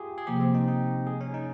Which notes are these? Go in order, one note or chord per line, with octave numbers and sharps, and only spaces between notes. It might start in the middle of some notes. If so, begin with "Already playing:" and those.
Already playing: F4 G4 G#4
G#4
C3 F3 A#3 G4
C4
D#4
D#4
G#4
C#4
D#4